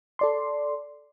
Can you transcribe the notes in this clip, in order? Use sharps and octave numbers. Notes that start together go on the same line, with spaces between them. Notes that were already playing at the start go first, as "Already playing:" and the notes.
A4 D5 C6